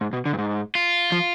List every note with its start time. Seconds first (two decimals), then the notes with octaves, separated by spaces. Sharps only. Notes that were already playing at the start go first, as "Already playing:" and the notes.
0.01 G#2
0.13 B2
0.26 D3
0.33 G2
0.38 G#2
0.75 F4
1.12 F3